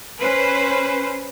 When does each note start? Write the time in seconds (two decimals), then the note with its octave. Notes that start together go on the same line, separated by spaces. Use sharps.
0.19 C#4 B4 C5